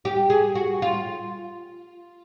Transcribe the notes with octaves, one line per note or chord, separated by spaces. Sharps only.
G4
G#4
F#4
F4